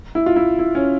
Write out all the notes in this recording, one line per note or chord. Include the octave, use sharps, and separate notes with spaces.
E4
F4
E4
E4
C#4